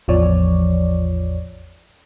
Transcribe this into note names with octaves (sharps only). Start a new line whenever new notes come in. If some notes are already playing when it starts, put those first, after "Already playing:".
A1 E2 F3 C#5 D5